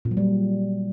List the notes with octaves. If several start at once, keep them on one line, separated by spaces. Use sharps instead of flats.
A#2
F#3
G3